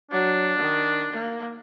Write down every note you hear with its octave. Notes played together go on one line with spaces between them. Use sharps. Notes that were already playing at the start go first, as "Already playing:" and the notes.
F#3 D4
D#3
A#3